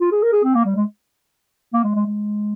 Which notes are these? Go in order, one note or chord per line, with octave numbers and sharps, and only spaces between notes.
F4
G#4
A#4
G#4
C4
A#3
G3
G#3
A#3
G#3
G#3
G#3